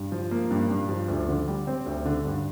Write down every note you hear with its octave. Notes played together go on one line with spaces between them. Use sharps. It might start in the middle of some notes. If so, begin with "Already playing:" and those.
Already playing: G2
F3
A#3
G2
G2
F3
D2
D3
G3
C4
D2
D3
G2